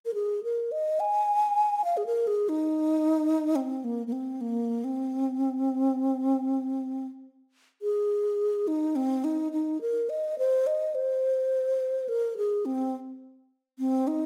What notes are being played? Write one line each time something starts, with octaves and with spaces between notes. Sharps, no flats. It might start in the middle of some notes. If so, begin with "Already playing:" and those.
A#4
G#4
A#4
D#5
G#5
F5
G#4
A#4
G#4
D#4
C4
A#3
A#3
C4
A#3
C4
G#4
D#4
C4
D#4
D#4
A#4
D#5
C5
D#5
C5
A#4
G#4
C4
C4
D#4